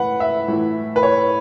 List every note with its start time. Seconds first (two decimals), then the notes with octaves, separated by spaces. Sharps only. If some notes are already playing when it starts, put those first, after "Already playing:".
Already playing: A2 E3 B4 F#5
0.20 E5
0.48 A2 E3
0.96 B4
1.03 C#5